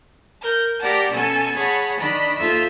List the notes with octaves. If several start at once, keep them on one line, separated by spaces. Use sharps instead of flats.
A#4 G6
G4 A#4 D5 F#5 A5
B2 C#4 A4 G#5
G#4 C#5 F#5 A5 B5
D#3 D4 D#5 B5
D#2 F4 A4 C5 E5